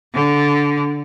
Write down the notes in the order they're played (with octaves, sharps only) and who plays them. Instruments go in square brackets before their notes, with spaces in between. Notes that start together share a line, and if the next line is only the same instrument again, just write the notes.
[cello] D3